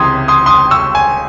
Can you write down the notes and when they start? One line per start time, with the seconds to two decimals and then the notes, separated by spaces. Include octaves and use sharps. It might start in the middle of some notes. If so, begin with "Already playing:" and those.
Already playing: C#2 C3 E3 C6 D#6 G#6
0.28 C6 D#6
0.46 C6 D#6
0.71 C#6 E6
0.95 G#5